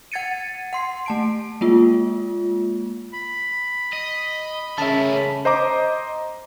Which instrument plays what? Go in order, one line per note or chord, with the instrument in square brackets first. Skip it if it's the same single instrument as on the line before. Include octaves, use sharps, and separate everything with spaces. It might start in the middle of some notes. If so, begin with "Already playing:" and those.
[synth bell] F#5 G#6 A6 C#7 D#7
F#5 C6 C7
A3 A5 D7
G#3 A#3 F4
[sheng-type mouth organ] B5
[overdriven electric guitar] D#5
[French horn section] C#3 C#4 [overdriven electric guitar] A3 A#4 [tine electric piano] E5 A5
[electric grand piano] C5 D#5 A#5 D6